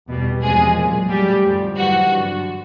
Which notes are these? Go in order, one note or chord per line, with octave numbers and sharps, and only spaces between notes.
E2 B2 G3
E2 C3 F3 G#3 G#4
A#2 F#3
A2 F#3 G3 G4
F2 D3 F3
G#2 E3 F#3 G3 F#4
G2 D3 F#3